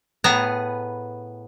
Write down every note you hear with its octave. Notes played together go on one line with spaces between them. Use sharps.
A2 B3 G#4 A5 A#5